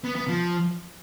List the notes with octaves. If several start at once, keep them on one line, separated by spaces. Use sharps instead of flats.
B3
B3
F3